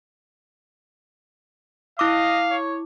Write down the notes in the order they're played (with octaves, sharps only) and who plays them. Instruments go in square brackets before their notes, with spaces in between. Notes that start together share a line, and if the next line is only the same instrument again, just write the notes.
[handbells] E4 D6 [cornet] D#5 [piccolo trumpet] F5
[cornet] C#5